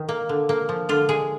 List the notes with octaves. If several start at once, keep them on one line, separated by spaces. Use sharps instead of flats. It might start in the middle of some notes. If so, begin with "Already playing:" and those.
Already playing: D#3
A#3
D3
A#3
F3
D3 F4
G#3 G#4